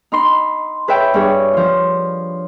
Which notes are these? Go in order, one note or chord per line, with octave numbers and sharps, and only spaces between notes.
D#4 B5 C6
G#4 B4 C#5 E5 G5
G2 D4 G#4 C#5
F3 F4